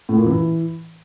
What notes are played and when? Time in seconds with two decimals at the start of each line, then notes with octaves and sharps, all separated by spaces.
0.09 A2
0.17 A#2
0.26 E3